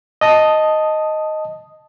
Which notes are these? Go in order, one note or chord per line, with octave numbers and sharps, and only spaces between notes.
D#5 A5 D#6